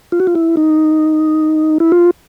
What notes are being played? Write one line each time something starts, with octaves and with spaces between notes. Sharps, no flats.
F4
F#4
F4
E4
D#4
E4
F4